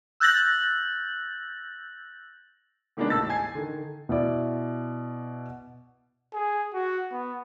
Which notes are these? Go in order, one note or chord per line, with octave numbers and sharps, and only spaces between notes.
E6 F#6 G6 A6 A#6 F#7
A#2 D#3 G#3 A#3 B3 D4
A1 D#2 A2 A5 E6 A6
G#5 G#6 C7
D3 D#3
B2 E4 D5
G#4
F#4
B3